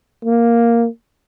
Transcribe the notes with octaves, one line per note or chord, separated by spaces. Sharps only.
A#3